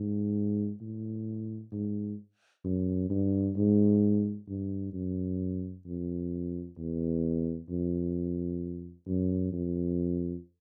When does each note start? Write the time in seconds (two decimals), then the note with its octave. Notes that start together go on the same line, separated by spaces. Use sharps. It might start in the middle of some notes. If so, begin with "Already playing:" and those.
Already playing: G#2
0.80 A2
1.72 G#2
2.64 F#2
3.10 G2
3.56 G#2
4.48 G2
4.93 F#2
5.86 F2
6.78 E2
7.69 F2
9.07 F#2
9.53 F2